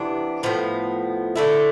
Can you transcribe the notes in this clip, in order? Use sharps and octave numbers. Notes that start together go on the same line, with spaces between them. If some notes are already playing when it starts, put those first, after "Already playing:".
Already playing: C3 E3 B3 D4
A2 F3 B3
D3 A3 E4